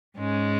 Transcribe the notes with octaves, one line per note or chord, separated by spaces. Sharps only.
G#2 G#3 C#4